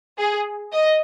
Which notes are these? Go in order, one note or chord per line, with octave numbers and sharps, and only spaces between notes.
G#4
D#5